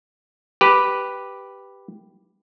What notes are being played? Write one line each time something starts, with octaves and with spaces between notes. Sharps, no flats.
G4 B4